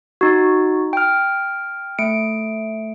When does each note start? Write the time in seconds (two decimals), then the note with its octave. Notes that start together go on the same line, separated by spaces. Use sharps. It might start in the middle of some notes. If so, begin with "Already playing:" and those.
0.21 D#4 F#4
0.93 G5 F6
1.99 A3 C#7 D7